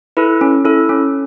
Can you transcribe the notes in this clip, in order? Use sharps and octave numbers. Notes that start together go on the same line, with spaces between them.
E4 A4 B4
C#4
E4 A4
C#4